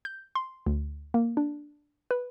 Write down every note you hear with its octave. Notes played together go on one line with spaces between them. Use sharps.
G6
C6
D2
A#3
D4
B4